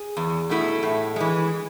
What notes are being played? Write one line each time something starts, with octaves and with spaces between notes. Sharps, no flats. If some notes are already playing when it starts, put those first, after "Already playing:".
Already playing: G#4
E2
B2 A3 E4
A2
E3 G#3